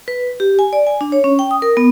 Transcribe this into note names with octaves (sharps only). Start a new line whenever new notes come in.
B4
G4
G#5
D5
G#5
D4
C#5
C#4
G5
D#6
A#4
B3